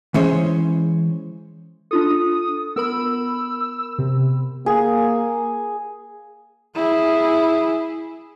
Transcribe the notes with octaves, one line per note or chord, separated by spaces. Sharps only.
E3 G#3 C#4 C5 C#5
D4 F4 A4 D#6
B3 A#4 B5 E6
C3
A#3 G#4
E4 G#4